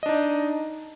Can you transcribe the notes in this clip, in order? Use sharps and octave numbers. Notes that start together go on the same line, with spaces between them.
D4 D#4 D#5